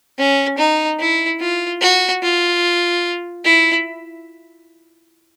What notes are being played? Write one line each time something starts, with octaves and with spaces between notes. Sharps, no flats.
C#4
D#4
E4
F4
F#4
F4
E4